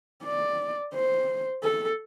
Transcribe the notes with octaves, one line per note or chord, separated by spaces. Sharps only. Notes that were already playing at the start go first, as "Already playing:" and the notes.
D5
C5
A4